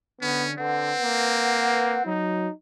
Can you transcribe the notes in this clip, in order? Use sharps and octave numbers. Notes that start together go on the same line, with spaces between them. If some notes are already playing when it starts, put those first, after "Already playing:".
D3 B3 C#4
D3 C4 B4 F#5
A#3
F#3 D#4